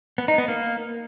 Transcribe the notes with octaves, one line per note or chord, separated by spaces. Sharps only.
B3
D#4
B3
A#3